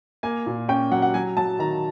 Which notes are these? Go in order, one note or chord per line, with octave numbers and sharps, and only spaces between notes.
A#3 G#5
A#2
C#4 G5
F#3 F#5
F#5
F#3 G#5
F#3 A5
D#3 A#5